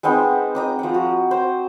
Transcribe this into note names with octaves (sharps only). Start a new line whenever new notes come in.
G#3 B3 C4 D#4
D#5 A#5 D6
F3 F#5
F#4
C5